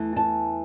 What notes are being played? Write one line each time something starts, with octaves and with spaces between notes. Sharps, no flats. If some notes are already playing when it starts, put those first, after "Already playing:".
Already playing: E2 E3 A3
A5